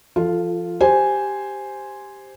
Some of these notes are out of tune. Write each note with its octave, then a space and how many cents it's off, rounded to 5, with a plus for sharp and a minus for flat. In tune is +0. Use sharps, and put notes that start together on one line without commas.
F3 -25 F4 +0 A4 +0
G4 +0 C5 +0 G#5 +0